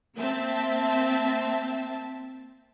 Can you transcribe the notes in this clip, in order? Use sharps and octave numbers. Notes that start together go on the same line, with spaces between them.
A#3 C4 E5 A5